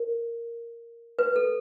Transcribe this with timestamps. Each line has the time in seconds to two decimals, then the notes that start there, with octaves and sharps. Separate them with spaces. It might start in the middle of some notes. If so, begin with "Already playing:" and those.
Already playing: A#4
1.19 B4
1.36 A4